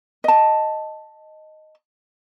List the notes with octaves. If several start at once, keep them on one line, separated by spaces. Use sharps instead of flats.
D#5 A5